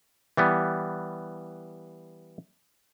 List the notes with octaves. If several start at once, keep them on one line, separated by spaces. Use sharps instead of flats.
E3 G3 B3